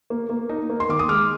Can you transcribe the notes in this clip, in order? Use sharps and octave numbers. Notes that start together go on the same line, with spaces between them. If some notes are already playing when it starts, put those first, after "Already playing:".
A#3
A#3
D#4
A#3
C6
D#3 D6
D#6
G#3 D6 F6